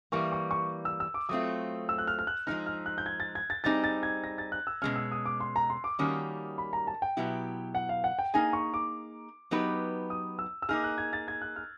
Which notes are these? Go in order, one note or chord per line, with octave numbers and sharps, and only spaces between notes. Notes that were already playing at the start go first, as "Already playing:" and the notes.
E3 G3 A#3 C#6
C#6
C#6
E6
E6
D6
F#3 A3 C4 F4 D#6
E6
F#6
F6
F6
F#6
F3 G#3 C4 D#4 F6
F6
F#6
G6
G#6
A6
G#6
A6
G3 C4 D#4 G#4 A6
A6
G#6
A#6
A6
F#6
E6
B2 G#3 C#4 F6
E6
D#6
D6
C6
A#5
C6
D6
D#3 G3 A#3 C#4 F#4 D#6
B5
A#5
A5
G5
B2 F#3 B3 E4 G4
F#5
F5
F#5
G5
A#3 D#4 G#4 G#5
C#6
D6
F#3 B3 D#4 G4 B4
D#6
E6
E6
A#3 D#4 G#4 F6
F#6
G#6
A6
G#6
F#6
F6